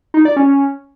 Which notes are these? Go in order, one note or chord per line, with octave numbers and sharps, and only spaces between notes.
D#4
D5
C#4